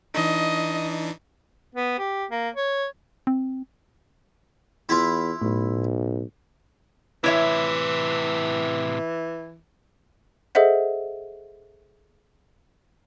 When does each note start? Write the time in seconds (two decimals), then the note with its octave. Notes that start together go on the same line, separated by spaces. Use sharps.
0.15 E3 D4 D#4 D#5
1.75 B3
1.99 G4
2.31 A#3
2.56 C#5
3.27 C4
4.89 E2 E4 F4
5.42 B1 A2
7.24 A2 C3 E3 E4 C#5 E5
10.55 G#4 A4 C5 D#5 E5 F#5